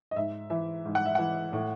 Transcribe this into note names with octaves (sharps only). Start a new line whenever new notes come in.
D#5
G#2 E5
E3 E5
G#2
F#5
E5
E3 F#5
A2